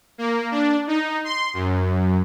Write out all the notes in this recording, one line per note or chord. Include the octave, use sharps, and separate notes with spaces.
A#3
D4
D#4
C6
F#2